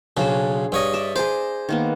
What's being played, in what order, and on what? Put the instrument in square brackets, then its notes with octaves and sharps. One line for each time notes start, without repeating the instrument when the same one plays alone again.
[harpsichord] B1 C#3 [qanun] D4 G#4 C5
[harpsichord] G2 C#5 D#5
[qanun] D5 E5
[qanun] G#4 A#5 D6 [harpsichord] C5
[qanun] D#3 A#3 B3